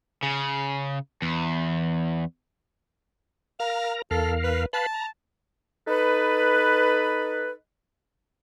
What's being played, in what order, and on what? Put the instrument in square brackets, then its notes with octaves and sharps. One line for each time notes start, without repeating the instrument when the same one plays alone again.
[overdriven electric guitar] C#3
E2
[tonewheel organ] A#4 A#5 [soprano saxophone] F5
[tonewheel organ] E2 A#4 F5 [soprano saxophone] A4
[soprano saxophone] B4
[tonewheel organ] B4 F5 B5 [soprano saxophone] A5
[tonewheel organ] A#5
[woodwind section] D#4 A4 B4